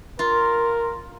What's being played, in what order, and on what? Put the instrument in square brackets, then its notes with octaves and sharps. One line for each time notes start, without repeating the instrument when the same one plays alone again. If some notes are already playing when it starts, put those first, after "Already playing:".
[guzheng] F4 [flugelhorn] A#4